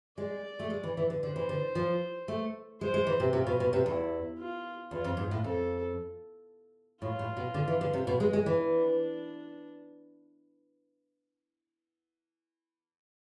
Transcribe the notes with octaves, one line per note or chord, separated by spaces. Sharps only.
G#3 D5
A3
G#3
E3
E3
D3
D3 C5
E3
D3
F3
A3
G#3 C5
G#3
E3
C3
C3 F4
B2
B2
C3
E2 E4
F4
E2 F4
F2
G#2
A2
F2 A4
A2 F4
A2
B2
D3
E3
D3
C3
B2
G#3
G#3
E3
D4